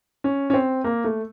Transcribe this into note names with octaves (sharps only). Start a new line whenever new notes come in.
C#4
C#4
C4
A#3
A3